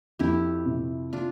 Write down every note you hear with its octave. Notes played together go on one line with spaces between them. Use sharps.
F2 E4 G4
C3
D4 F4